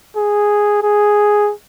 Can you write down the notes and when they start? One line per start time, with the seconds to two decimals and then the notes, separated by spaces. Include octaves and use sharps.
0.16 G#4
0.83 G#4